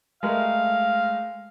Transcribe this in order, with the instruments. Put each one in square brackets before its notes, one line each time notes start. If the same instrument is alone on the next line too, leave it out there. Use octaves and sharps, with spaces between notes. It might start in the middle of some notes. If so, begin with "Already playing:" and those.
[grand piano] G#3 A3 A#4 [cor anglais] F5